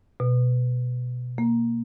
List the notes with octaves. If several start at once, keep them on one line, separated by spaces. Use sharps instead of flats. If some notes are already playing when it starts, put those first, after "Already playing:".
B2
A#3